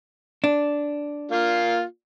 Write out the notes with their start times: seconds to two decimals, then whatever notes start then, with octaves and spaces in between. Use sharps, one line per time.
0.44 D4
1.31 A#3 F4